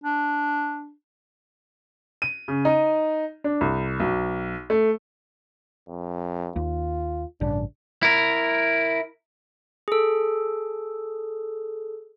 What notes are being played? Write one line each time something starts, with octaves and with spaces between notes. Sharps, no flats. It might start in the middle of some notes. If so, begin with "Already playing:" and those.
D4
D#7
C#3
D#4
D4
C2
B1
A3
F2
D#2 F4
A1 G2 C#3 D4
E4 A#4
G#4 A4